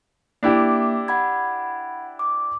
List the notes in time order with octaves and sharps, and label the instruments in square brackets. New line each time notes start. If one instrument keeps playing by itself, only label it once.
[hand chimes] A#3 E5 D6 [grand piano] D4 E4 G4
[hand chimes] F#5 B5 G#6
D6